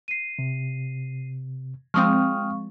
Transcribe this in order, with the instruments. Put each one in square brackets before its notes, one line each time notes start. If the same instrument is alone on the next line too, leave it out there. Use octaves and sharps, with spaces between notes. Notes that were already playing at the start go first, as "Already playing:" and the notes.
[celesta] C7 D#7
[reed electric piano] C3
[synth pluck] F3 G#3 C4 [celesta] F5 C#6 [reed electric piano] G5 D#6 F6